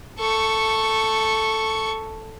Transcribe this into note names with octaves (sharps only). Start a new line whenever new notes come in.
A4 C#6